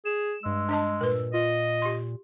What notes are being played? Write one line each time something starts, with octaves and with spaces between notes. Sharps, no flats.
G#4 E7
G2 G#3 E6
D4 D#5 A5
A#2 A#4 B4
F4 D#5
G4 C6